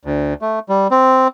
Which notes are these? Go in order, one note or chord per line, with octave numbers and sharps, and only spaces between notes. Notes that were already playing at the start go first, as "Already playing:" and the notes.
D2
A3
G3
C4